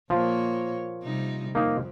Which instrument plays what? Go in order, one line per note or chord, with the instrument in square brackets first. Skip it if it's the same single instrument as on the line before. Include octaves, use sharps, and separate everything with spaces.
[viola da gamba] A#2 A#3 C#5 [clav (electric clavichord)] F3
[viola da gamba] C3 G3 D#4
[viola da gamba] F2 [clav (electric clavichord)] A#3 D#4